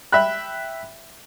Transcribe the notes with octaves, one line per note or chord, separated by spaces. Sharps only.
E5 G5 B5 F#6